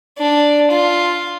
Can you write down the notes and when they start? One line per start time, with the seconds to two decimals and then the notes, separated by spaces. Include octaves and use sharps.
0.18 D4
0.71 F4